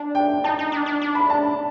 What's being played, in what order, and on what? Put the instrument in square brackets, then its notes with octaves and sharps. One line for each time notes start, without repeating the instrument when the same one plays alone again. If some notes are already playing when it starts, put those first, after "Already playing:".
Already playing: [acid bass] D4
[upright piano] G5
[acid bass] D#4 [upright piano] A5
[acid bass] D#4
D4
D4
D4
[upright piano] B5
A5